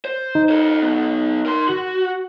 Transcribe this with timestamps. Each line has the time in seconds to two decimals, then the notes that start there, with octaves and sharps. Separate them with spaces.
0.05 C5
0.35 D#4
0.49 A4 C5
0.82 F#3 B3
1.46 A#4 C6
1.68 F#4